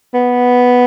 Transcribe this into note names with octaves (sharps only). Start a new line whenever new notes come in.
B3